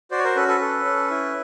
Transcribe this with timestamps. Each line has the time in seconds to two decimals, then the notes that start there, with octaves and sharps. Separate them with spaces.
0.11 F#4 C5 D5
0.19 C#5
0.24 A#4 C5
0.36 C#4 A4 B4
0.48 A4 B4
0.61 A4
0.85 C#4
1.10 E4